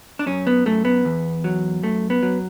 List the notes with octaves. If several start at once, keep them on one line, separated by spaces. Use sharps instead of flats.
D4
F#2 C#4
B3
F#2 A3
B3
E2
F#3
F#2 A3
B3
F#3